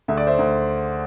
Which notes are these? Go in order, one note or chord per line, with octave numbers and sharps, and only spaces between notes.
D2 E5
D5
C5 E5
D2